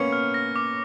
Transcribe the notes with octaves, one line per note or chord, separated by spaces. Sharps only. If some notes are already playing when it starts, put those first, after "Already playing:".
Already playing: A#3 B3 C#4 C#7
F6
A#6
D6